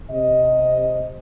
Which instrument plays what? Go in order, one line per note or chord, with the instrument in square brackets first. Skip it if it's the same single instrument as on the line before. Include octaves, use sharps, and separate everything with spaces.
[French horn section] C3 D#5